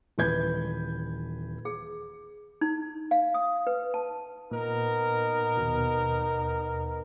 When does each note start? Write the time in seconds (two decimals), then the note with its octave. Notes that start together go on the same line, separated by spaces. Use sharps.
0.18 D#1 E3 B4 G6 G#6
1.65 G#4
2.61 D#4
3.11 F5
3.34 D#6
3.67 B4
3.94 A5
4.51 A#2 B3 D#4 A#4
5.57 D#2 B2